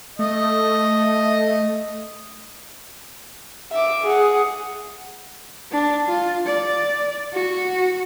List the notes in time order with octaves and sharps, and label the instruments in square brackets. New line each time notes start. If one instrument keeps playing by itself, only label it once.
[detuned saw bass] A3 [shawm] D#5
[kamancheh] E5 D6
G#4 F#5
[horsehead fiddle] D4
F4
D5
F#4